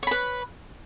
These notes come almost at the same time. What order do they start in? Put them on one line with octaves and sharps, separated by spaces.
C#5 B5 B4